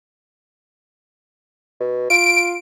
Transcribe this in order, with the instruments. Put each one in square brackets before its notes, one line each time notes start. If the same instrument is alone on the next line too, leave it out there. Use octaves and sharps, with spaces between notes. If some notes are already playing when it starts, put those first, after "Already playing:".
[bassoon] B2
[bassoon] F4 [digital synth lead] D7